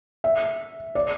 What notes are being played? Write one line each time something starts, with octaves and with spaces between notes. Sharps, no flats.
E5
D5